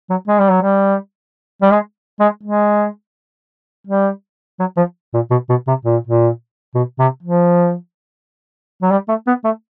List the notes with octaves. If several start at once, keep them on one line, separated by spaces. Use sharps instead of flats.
F#3
G#3
G3
F#3
G3
G3
G#3
G#3
G#3
G3
F#3
F3
A#2
B2
B2
C3
A#2
A#2
B2
C3
F3
F#3
G3
A3
B3
A3